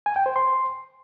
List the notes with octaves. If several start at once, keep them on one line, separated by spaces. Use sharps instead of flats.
G#5
G5
C5
C6